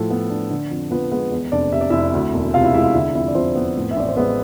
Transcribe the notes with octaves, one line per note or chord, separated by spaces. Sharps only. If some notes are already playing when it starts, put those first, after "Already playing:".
Already playing: A2 F3 A4
B3
D4
D3
F2
F3 B3 B4
G#3 B3 B4
E2
F1 D4 D5
C3 E5
D5
F1 E4 E5
D2
E1
C3 F4 F5
E4 E5
G#3 E4 E5
F4 F5
D3 E4 E5
F2 E4 E5
D5
F3 C4 C5
B3
A2
E5
A1 D5
C5
G#3 B3 B4